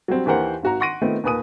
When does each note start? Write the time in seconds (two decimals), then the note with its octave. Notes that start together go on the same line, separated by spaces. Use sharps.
0.08 F#3 G3 C4
0.26 D#2 E3 G4 A#4 C5 F#5
0.63 G#1 F#4 A#5
0.80 F#5 C6 C#6 A#6 D7 D#7
1.01 D#3 A3 B3 C4 F4
1.24 D#2 A#2 B4 G#5 D#6 D#7